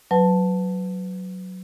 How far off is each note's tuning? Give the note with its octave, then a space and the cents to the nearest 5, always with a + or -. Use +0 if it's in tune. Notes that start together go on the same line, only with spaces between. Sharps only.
F#3 +0 B4 +20 A5 +0